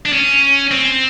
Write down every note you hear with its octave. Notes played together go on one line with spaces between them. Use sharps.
D4
C#4
C4